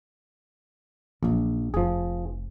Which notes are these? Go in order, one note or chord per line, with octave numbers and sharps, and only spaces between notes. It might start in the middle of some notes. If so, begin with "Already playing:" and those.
A#1 C#3 F#3
F1 F3 G#4